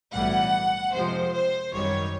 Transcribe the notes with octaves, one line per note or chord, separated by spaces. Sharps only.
B1 A2 E3 G3 F#5
F2 C3 F3 G#3 C5
C5
G#1 F#2 D#3 G3 C#5